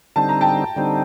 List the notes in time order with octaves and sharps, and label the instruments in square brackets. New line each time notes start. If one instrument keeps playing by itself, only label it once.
[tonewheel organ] D3 G3 C4 D#4 [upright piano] A5
[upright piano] A#5
G5 A5
[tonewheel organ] D3 G3 C4 D#4